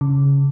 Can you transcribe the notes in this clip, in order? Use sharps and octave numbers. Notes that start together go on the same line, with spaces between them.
C#3